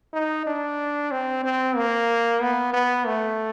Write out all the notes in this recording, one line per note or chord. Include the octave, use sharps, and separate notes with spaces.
D#4
D4
C4
C4
A#3
B3
B3
A3